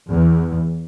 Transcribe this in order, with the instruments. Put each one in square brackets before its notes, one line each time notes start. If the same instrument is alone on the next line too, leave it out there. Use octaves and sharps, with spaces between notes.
[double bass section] E2